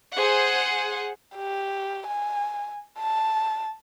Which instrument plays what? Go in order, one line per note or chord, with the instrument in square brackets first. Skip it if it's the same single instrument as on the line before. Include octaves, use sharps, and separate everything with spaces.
[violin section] G#4 C5 F#5
[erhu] G4
G#5
A5